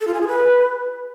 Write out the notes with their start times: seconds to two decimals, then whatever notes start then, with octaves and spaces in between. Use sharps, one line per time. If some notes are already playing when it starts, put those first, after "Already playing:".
0.01 A4
0.07 F4
0.14 G#5
0.21 G#4
0.28 B4